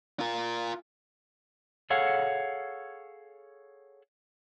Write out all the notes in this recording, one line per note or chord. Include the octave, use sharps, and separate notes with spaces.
F4 A#4
G#4 A4 C#5 F5 F#5